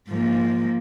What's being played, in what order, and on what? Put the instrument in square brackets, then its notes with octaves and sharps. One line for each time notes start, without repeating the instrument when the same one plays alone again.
[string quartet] G#2 F3 A#3